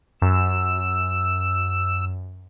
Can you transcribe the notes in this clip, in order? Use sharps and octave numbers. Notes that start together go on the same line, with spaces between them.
F#2 E6